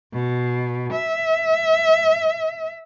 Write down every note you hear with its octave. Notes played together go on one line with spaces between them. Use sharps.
B2
E5